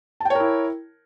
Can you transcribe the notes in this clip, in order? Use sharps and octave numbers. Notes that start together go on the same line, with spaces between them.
E4 A#4 C#5 G5 A5